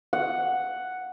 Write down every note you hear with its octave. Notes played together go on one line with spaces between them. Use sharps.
F#5